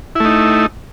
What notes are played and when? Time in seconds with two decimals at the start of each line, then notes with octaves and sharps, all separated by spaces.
0.15 E4
0.20 A3
0.25 D#4